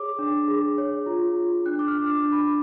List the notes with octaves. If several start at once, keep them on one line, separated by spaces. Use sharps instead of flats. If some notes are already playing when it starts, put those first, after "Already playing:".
Already playing: G#4 C#5 D6
D4
G#4
C#5
F4
F4
D4 F#6
D6
F6
D4
D6
D4
B5